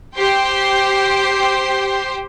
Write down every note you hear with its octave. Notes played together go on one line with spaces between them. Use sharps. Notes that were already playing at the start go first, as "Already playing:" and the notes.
G4 C5 G5 C6